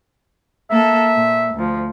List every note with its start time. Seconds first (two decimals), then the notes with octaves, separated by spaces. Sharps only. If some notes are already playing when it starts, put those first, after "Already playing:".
0.71 A#3 A4 E5
1.15 A#2
1.55 D2 F3